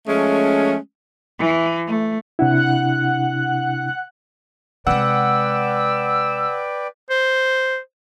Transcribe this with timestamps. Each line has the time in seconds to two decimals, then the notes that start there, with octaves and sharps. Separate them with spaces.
0.07 F3 G#3 A3 C#4
1.38 E3
1.86 A3
2.39 C3 D4 E4 F#5 F#6
4.87 C3 G#3 B4 D5 F#5 G5 E6
7.10 C5